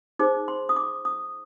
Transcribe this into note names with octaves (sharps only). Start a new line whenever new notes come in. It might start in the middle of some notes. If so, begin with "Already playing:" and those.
D#4 G#4 C5 D6
C6
D#6
D6
D#6